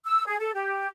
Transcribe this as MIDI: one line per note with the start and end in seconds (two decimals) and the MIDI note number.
0.06 0.24 88
0.27 0.37 68
0.40 0.51 69
0.55 0.88 67